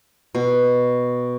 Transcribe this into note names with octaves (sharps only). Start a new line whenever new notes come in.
B2